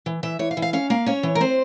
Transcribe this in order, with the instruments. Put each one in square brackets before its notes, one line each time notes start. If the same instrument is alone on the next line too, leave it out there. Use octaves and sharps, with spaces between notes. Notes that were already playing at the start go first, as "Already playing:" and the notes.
[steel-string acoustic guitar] E3
E3 E5
E3 C#5
F5
E3
F5
C#4 F5
A#3 F5
C#4 C#5
E3
A#4
C4 C5